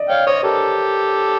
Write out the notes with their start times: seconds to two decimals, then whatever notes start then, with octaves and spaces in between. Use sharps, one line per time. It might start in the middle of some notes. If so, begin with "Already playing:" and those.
Already playing: D5 D#5
0.09 C#5 F5 G5
0.26 C5 C#5 D#5
0.43 G4 A4 A#4